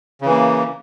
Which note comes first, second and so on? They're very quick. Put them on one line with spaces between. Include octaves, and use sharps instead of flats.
C#3 E3 A#3